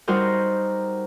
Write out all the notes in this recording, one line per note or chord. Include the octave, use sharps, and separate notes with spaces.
G3 D#4 F#4 A#4 C5